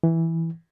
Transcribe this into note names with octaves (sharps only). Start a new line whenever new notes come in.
E3